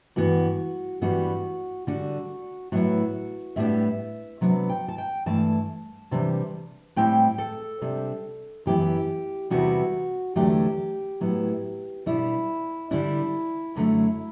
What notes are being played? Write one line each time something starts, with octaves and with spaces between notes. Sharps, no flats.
G2 E3 B3 F#4
G2 E3 G3 B3 F#4
D3 G3 D4 F#4
A2 F#3 B3 E4 F#4
A2 G3 B3 D4 E5
C3 F#3 B3 D4
G5
A5
G5
G2 E3 A3 E4 A5
C3 E3 G3 D4
A2 G3 C4 E4 G5
A4
C3 G3 D4
F#2 E3 G3 B3 E4 G4
E2 C3 G3 B3 E4 F#4
E2 D3 F#3 A3 D4 G4
A2 F#3 B3 E4
B2 G3 D4 E4
D3 G3 D4 E4
F#2 D3 F#3 A3